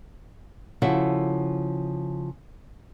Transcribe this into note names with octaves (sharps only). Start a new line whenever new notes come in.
C#3 F3 E4 F#4 A4 E5